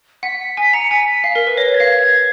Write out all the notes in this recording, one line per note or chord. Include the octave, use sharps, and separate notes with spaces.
F#5 B6
B6
G#5 B6
A#5 C#7
G#5 B6
F5
A#4
B4
C#5 A#6
G#6
F5